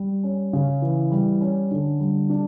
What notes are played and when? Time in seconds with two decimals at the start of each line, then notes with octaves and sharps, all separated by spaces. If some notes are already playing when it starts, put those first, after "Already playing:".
Already playing: G3
0.23 C#4
0.53 C#3
0.82 E3
1.11 G3
1.41 C#4
1.71 D3
2.00 G3
2.29 D4